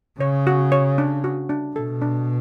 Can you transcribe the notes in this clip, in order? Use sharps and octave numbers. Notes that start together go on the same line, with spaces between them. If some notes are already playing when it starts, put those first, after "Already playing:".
C#3 C#5
F#4
C#5
D4
F#4
D4
B2 A4
D4